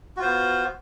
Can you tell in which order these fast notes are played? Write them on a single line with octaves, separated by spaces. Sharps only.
F#4 F4 C5 B3